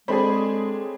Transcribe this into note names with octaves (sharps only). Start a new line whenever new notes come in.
G#3 C4 D4 G#4 A4 C#5 B5